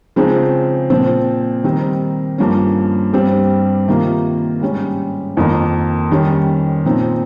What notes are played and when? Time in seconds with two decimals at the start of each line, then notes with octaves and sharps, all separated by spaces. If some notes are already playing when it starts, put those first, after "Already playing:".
0.16 C#3 F3 G#3 C4 D#4
0.90 A#2 F3 C4
1.64 D#3 G3 C4 D#4
2.38 G2 F3 A#3 C#4
3.13 G2 G3 C4
3.88 C3 D#3 A#3 F4
4.61 G#2 G3 C#4
5.37 F2 D#3 A#3
6.11 D#3 G3 C#4
6.85 A#2 F3 C4 D#4